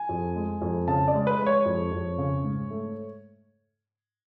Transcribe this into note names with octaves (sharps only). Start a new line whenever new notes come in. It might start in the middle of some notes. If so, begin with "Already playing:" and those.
Already playing: G#5
F2
G#3
F2
C#3 A5
D5
G#3
B4
G#3
C#5
F2
F2
C#3
G#2
A3